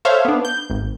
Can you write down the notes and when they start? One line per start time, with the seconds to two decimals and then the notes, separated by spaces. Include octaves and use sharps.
0.05 A4 C5 C#5 E5 F5
0.25 B3 D4
0.45 G6
0.70 G#1